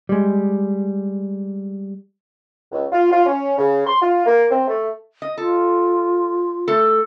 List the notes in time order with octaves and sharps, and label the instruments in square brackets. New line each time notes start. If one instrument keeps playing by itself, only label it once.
[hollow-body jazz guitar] G3 G#3
[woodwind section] C#2
F4
F4
C#4
C#3
C6
F4
A#3
C4
A3
[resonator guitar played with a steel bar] D#5
[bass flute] F4 [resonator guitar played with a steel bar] A4
[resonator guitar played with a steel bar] A3 A4